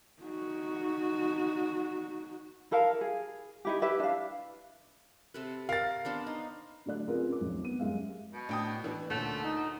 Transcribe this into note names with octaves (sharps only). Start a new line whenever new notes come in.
D#4 F#4
E4 A4 A#4 F5
G#4
D#4 E4 G4
E4 G4 B4 E5
D4 F5
C3 A4 B4
A#4 F5 A6
B3 D4 C5
D#4
D3 F#3 A3 D5 F#6
C4 C#4 F4 G#4 A#4 B4
C#4 D6
F1 B1
B3 D#7
F#2 G3 G#3 E5 F5
B2
A2 D4 G5 D#6
E3 D4 E4 B4
D2 A#2 D3 A3 C#4
D#4